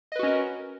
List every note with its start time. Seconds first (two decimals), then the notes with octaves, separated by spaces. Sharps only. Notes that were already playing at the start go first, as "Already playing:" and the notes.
0.12 D#5
0.16 B4
0.19 F#4
0.23 C#4
0.27 A#4